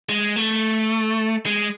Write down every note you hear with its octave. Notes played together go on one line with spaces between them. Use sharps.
G#3
A3
G#3